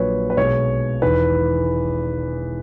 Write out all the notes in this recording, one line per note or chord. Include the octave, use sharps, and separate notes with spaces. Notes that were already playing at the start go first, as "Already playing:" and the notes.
Already playing: A#1 A#2 F#3 B4 C#5
B4
B1 B2 G#3 C#5
E1 E2 D#3 B4